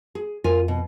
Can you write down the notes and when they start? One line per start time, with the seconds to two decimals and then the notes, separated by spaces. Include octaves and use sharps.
0.15 G#4
0.44 F2 F4 A#4 G#5
0.68 B2